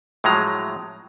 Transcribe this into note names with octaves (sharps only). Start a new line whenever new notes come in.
A2 F3 F#3 G#3 A#5